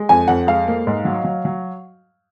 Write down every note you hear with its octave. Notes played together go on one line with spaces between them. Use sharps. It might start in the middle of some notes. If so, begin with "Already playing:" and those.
Already playing: G#3
F2 G#5
F2 F#5
G#3 F5
A#3
G#2
F#3
F#3
F#3